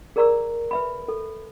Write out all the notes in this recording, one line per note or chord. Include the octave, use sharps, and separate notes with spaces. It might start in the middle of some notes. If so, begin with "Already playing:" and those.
G#4 A#4 D5 A#5 C#6 E6
B4 E5 B5
A4